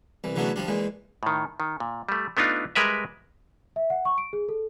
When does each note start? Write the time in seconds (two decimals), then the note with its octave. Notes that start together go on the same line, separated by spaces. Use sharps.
0.24 C2 E3
0.36 C#3 E3 F#3 A3 B3 D4
0.56 F3 G3 D4
0.68 A#2 E3 G#3
1.23 A2 D#3
1.60 D#3
1.80 A#2
2.09 G3 A3
2.37 A3 B3 D4 D#4 F4
2.75 G3 G#3 A#4 B4 E5
3.76 E5
3.90 F#5
4.05 C#6
4.18 D7
4.33 G#4
4.49 A4